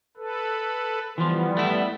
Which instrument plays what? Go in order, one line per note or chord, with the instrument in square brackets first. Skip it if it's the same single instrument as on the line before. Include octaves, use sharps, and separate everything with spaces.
[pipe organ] A4 B4
[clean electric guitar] E3 F3 [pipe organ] G3 B3
[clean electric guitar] A3 E4